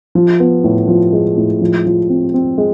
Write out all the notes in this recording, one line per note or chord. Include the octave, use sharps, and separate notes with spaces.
F3
B3
A2
F3
G#3
A2
F3
F3
C4
C4
G#3